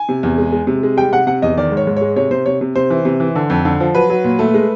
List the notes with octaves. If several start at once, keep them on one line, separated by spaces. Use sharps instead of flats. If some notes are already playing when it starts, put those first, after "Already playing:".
Already playing: G#5
C3
E2
G#3
G#3
C3
G#3
G3 G5
C3 F#5
C3 F#5
E2 D#5
D#3 D5
G#2
C#5
G#2
G#3 C#5
C3 C#5
C3 C5
C3 C#5
C3
C3 C5
E3
C3
E3
D3
F2
D3
F3
F#3 B4
F#3
A#2
A3
G#3